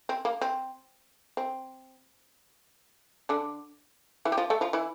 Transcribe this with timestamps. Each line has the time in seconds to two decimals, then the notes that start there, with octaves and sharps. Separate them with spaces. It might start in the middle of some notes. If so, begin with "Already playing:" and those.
0.09 C4
0.25 A#3
0.41 C4
1.37 C4
3.29 D3 D4
4.25 E3 E4
4.32 G4
4.38 F3 F4
4.50 A3 A4
4.61 F3 F4
4.73 E3 E4